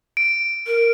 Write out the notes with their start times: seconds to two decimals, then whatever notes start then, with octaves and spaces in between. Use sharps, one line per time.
0.17 D7
0.67 A#4